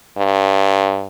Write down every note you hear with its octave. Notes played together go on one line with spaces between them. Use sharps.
G2